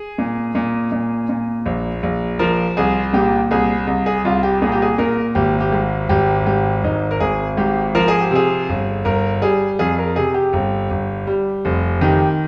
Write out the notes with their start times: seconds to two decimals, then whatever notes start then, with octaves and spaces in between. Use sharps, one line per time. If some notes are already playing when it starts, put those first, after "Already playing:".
Already playing: G#4
0.18 A#2
0.55 A#2
0.92 A#2
1.29 A#2
1.66 A#1
2.03 A#1
2.39 F3 A#4
2.77 C2 G#4
3.13 A#2 G4
3.51 C2 G#4
3.87 C2
4.06 G#4
4.25 C2 F4
4.43 G4
4.62 A#2 G#4
4.72 G4
4.82 G#4
4.98 A#2 A#4
5.35 G#1 G4
5.61 G4
5.72 G#2
6.09 G#1 G4
6.46 G#2 G4
6.84 G#1 D#4
7.11 A#4
7.20 G#1 G#4
7.57 G#2 G4
7.95 F3 A#4
8.08 G#4
8.21 G4
8.31 C3 G#4
8.69 G1
9.05 G1 A#4
9.42 G3 G#4
9.79 F2 G#4
9.98 A#4
10.16 C3 G#4
10.34 G4
10.53 G1
10.91 G1
11.27 G3
11.65 F1
12.01 D#3 G4